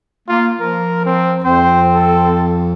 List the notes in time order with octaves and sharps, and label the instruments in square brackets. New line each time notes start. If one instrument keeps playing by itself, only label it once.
[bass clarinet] A#3 [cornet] F4
[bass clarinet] F3 [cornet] A#4
[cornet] C4
[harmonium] F2 [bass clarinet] C4 [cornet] C5
[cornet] A4